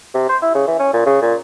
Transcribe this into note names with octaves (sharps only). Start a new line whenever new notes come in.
C3
C5
E4
C#3
E3
C#4
A#2
C#3
A#2